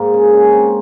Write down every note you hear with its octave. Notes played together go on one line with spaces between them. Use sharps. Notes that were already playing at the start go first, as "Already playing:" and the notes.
Already playing: G#2 A#3
C#3
C#4
C4